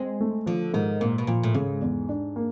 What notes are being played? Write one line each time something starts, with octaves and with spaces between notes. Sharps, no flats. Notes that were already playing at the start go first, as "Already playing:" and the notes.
Already playing: G#3 C4
A3
D3 F3
G#2 D#3
A#2 A#3
B2
A#2 F3
A2
G#2 C#3
E2
D4
A#3